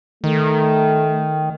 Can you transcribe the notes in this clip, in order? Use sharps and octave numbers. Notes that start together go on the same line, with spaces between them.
D#3 A3